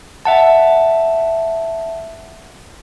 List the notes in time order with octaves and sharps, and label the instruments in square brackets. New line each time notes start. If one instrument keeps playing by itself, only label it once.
[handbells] E5 F#5 A5